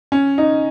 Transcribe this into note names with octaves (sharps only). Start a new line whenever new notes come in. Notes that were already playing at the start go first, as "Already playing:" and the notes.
C#4
D#4